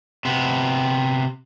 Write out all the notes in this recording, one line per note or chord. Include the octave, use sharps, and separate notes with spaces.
C3 B3